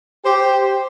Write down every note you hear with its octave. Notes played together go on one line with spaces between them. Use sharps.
G4 C5